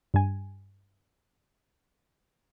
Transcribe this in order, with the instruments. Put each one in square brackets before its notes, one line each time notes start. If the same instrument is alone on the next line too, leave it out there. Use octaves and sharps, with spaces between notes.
[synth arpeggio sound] G2 G#5